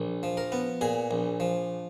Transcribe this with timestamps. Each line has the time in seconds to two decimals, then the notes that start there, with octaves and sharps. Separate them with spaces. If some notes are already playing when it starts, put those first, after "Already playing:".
Already playing: A#1
0.23 F3
0.37 A#4
0.52 B3
0.81 A#2 G#4
1.11 A#1
1.40 F3